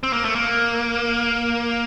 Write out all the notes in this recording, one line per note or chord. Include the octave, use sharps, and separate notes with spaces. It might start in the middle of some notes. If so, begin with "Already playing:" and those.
C4
A#3
A3
A#3